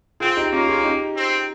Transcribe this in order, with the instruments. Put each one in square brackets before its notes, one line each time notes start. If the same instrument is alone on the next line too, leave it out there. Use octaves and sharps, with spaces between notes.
[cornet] C4 [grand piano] F4 G#4
[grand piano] D#4 G4
[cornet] A#3 [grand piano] C#4 F4
[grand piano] F4 G#4
D#4 G4
[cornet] C4